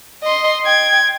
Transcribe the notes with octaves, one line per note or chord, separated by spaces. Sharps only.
D#5 C6
G5 G#6